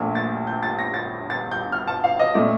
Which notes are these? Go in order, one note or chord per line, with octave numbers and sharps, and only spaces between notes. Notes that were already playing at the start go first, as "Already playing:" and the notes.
Already playing: A#1 A#2 A3
A6
G6
A6
A#6
A6
A6
G6
F6
A5
F5
D#5
A#2 A3 D5